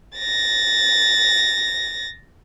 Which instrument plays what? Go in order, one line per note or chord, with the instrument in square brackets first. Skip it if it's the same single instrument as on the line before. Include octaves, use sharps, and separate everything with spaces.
[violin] A6 A#6